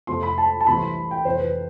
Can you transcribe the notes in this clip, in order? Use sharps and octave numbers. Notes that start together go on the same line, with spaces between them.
F2 C3 F3 A3 C6
B5
A5
A5
C2 C3 E3 A3 B5
C6
G5
F1 F2 E3 C5
B4